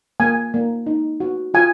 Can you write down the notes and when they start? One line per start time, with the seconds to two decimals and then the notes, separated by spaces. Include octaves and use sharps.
0.20 A#3 G#5
0.54 A#3
0.87 D#4
1.20 F#4
1.54 F4 G#5